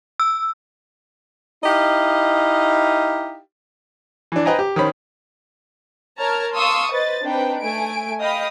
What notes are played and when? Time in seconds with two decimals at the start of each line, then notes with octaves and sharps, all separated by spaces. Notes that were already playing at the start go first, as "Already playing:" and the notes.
0.20 E6
1.63 D#4 E4 G4 D#5 F5
4.32 E3 D4
4.45 B4 C5 D#5 G5 G#5 A#5
4.59 G4
4.76 D#3 C#4 C5 B5
6.18 A#4 C#5 A5 A#5 F6 G#6
6.54 F5 A5 C6 C#6 D#6 E6
6.91 B4 C5 D#5 A6
7.23 C4 D4 D#4 B4 G5
7.60 A3 G#5 D7
8.20 D#5 F5 G5 B5 D#6